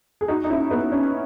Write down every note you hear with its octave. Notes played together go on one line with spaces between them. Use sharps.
G#4
D#4 F#4
D#4
C#4 E4
B3 D#4
C#4